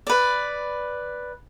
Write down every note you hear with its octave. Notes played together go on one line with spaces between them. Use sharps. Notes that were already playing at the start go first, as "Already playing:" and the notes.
B4 D5